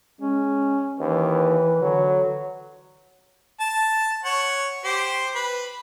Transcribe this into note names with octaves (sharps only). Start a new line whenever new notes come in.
G#3 C#4
D#2 E3 B4
D3 F#3
A5
C#5 F#5
G4 C5
B4